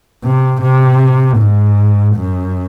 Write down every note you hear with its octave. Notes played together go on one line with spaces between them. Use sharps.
C3
C3
G#2
F#2